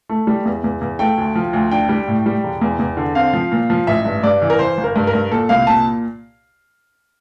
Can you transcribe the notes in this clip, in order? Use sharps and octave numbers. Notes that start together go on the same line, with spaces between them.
A3
G3
E2
E2
E2
A3 G5
D2
F3
D2
D4 G5
G3
A2
G3
E1
E2
E2
D3
C4 F5
F3
A#2
F3
A1 E5
G2
G2 D5
E3
A#4
E3 C5
G1
A#4
G2
A#4
G2
A#2 A4
C2 F5
A#2 A5